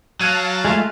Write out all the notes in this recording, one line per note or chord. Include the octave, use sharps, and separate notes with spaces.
F#3 F5 A5 F#6 G#6 D#7
G#3 A3 F4